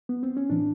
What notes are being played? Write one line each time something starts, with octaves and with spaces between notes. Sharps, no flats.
B3
C4
C#4
A2 E3 D4